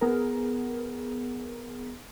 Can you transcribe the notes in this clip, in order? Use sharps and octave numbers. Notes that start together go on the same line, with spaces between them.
B3 G#4 A#4